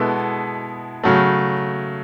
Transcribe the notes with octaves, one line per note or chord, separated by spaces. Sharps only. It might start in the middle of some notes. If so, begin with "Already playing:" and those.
Already playing: B2 G#3 B3 E4 A4
C#3 F#3 A3